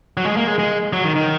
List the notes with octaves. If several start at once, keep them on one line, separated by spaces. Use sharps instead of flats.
F#3
G#3
A#3
G#3
G#3
F#3
D#3
D#3